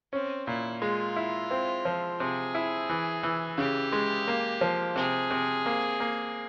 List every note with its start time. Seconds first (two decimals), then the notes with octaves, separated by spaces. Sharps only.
0.13 C4 C#4
0.47 A#2 E4
0.82 G#3 F4
1.16 E4
1.51 C4
1.85 F3
2.20 C3 G#4
2.55 E4
2.90 E3
3.23 E3
3.58 C#3 G4
3.92 G#3
4.28 A#3
4.61 F3
4.96 C3 G#4
5.31 C3
5.66 A#3
6.00 A#3